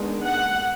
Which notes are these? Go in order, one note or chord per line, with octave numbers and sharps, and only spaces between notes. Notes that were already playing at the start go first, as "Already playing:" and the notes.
Already playing: D#3 G#3 B3 D4
F#5